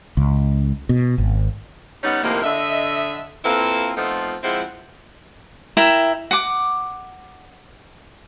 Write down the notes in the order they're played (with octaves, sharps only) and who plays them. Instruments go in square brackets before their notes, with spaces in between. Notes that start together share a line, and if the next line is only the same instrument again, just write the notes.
[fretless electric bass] C#2
B2
G#1
[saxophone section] G3 B3 C#4 D#4
A2 C3 D#3 F3 A#3
D3 D#5 E5
A#3 C4 E4 F4 A4 B4
F3 A3 B3 C4 D#4 F4
F3 G#3 C4 E4 C5 F#5
[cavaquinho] E4 A#4 E5 G5
F#5 D6